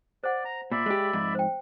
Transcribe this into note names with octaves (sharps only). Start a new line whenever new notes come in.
C5 D5 F#5
A#5
A#2 D5 E5 B5
G#3 G4
F2 G#2
C5 G5